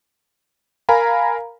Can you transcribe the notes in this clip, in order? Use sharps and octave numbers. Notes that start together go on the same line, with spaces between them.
A#4 F5 G#5 A#5 B5